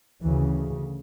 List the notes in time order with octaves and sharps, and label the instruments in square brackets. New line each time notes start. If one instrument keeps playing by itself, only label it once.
[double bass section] D2 C#3 E3